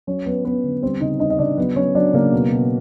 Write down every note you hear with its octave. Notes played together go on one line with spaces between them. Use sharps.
F#3 C#4 C#5
F#3 B3 B4
F#3 B3 B4
D3
G3 C4 C5
C#3 D#4 D#5
G3 D#4 D#5
D#5
C#3 D4 D5
F#3 B3 B4
F#3 C#4 C#5
F#3 D4 D5
C#3 A#3 A#4
B2
B2